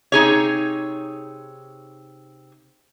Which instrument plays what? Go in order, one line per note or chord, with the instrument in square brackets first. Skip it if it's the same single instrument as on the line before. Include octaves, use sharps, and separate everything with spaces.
[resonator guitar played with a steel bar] C3 D#4 G#4 C#5